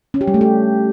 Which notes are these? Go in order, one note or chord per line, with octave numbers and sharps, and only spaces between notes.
C#4
G4
G3
A3
G4